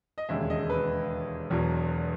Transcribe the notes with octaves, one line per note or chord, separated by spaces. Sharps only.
D#5
E1 D#2 C#3 G#3 E5
D#5
B4
E1 E2 B2 F#3